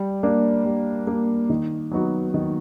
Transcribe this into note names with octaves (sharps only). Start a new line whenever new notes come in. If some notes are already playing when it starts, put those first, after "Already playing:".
Already playing: G3
A#3 D4
G3
A#3 D4
D#3
F#3 B3 D#4 F#4
D#3